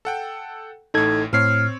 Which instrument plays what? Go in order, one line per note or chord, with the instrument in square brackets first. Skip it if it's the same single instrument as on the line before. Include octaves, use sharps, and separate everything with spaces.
[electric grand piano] A4 F#5 G5
[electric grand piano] A1 A2 [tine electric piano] D#4 A4 G#6
[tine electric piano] A2 C7 [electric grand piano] C4 C#5 [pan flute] F6